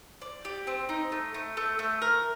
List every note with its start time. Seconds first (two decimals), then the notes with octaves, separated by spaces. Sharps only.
0.21 D5
0.45 G4
0.67 C4
0.89 D#4
1.12 A3
1.34 A3
1.57 A3
1.79 A3
2.02 A#4